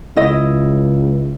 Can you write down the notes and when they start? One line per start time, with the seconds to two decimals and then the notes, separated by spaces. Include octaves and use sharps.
0.16 C#2 E4 D#5